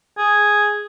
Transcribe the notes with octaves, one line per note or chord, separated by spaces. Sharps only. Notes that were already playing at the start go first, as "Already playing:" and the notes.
G#4